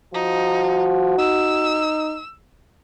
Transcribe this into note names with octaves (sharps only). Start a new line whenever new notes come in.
F3 D#4 F#4
D#4 E6